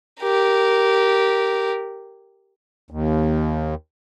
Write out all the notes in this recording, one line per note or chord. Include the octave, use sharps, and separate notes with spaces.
G4 A#4
D#2